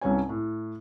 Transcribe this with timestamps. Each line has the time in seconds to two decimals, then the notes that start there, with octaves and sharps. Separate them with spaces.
0.01 C2 G2 C#4 C#5 G#5
0.29 A2